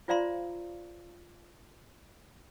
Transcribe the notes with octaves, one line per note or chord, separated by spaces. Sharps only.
F4 C5 D5 F5 A#5 C6